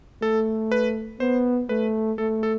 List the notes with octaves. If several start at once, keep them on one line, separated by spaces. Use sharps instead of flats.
A3 A4
B4
B3 C5
A3 B4
A3 A4
A4